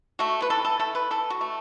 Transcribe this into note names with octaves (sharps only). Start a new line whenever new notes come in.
A3 F#4
B4
E3 A4
A4
A3 A4
B4
E3 A4
F#4
A3